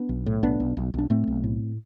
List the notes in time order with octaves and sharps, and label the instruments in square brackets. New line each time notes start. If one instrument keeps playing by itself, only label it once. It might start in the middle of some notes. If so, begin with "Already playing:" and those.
Already playing: [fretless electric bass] B3 D4
B1
A2
B1 B3 D4
B1
B1
B1 D4
A2 A3 C4
B1
A2